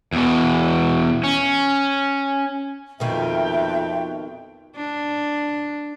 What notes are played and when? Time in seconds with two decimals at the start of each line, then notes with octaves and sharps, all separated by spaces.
0.13 E2 B2
1.24 C#4
3.00 F2 B2 D#3 A#3 E5 G5
4.77 D4